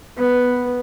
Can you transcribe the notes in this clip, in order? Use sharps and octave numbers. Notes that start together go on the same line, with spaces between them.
B3